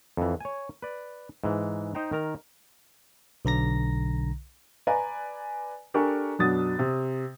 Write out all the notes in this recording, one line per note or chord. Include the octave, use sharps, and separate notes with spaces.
F2 E3
C#5 G#5
B4 D5
G#2 E3
D#4 C5 G5 A#5
D#3 A#4 A#5
B1 D3 A#5 A#6
B4 D5 G#5 A#5
D4 G4 A4 A#4 G#5 C#6
F#2 B2 D4 F#4 D#6 A6
C3